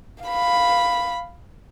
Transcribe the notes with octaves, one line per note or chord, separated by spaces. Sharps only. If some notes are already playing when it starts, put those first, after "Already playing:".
F5 B5